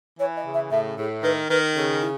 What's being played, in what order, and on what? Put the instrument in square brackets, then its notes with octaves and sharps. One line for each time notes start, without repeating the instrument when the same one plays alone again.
[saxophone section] E3 [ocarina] C#5
[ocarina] D#5
[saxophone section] C#3
[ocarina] E5
[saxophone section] A2 [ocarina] E5
[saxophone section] A2 [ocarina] G#4
[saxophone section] D#3 [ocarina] B4
[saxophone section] D#3 [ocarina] B4
[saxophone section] C#3 [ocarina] A4
[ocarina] E4